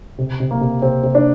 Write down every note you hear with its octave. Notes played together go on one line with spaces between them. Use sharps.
C3
C3
A#3
C3
C3 C4
C3
D4